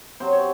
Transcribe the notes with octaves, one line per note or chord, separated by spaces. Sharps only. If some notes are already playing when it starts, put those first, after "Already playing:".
C3 F#3 C5
C#5